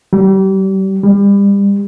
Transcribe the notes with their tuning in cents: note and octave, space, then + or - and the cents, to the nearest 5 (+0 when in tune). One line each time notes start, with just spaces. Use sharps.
G3 -35
G3 +30